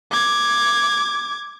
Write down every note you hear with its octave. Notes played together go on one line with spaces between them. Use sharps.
D6 G#6